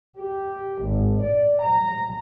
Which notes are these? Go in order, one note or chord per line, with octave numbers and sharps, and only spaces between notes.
G4
G#1
D5
A#5